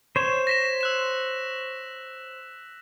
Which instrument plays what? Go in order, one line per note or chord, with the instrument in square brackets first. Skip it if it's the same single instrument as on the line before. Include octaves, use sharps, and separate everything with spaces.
[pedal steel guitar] C5 C#5 [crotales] E7
[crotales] A#6 B6 E7
E6 F#6 E7